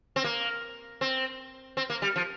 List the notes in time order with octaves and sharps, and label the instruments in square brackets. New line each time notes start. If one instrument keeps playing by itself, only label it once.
[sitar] C4
A#3
C4
C4
A#3
G3
F3